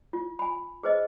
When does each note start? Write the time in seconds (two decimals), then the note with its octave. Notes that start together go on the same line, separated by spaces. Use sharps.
0.13 F4
0.39 G#5 B5
0.83 G#4 B4 C5 D#5